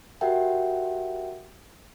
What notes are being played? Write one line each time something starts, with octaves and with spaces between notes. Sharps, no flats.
F#4 G4 A#4 E5 F#5 G5